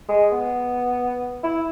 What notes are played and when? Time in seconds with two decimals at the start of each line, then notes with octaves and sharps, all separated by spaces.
0.09 G#3
0.32 B3
1.44 E4